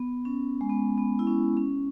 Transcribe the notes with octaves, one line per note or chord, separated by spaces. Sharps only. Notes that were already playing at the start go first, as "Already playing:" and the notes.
Already playing: B3
C#4
G#3
B3
B3
E4
C#4
C#4